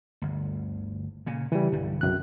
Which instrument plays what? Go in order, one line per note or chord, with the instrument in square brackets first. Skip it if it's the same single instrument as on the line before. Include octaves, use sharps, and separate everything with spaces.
[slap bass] G1 D2
A#2 C#3
[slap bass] C#3 [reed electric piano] E3 G3
[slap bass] B1 D3 G3 [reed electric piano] G2
[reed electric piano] C2 F#2 F#6